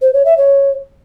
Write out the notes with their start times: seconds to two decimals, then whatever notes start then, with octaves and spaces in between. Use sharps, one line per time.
0.01 C5
0.13 C#5
0.25 E5
0.37 C#5